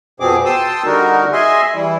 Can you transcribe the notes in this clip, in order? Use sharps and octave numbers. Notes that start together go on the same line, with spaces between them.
F2 B2 F3 C4 G#4 D6
G5 A5 C6 D#6 E6
D3 G3 D#4 F#4 A#4
G#4 D#5 E5 G#5 C6
E3 G3 E4